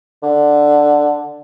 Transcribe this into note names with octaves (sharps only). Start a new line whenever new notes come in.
D3